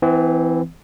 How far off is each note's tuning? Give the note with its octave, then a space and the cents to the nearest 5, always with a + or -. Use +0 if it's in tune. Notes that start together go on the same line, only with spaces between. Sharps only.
E3 +0 C4 -35